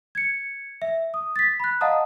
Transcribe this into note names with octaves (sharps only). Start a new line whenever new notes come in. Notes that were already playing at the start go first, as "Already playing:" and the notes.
G#6 C#7
E5
D#6
A6 B6
B5 F#6
D#5 F5 F#5 A5 A#5 D#6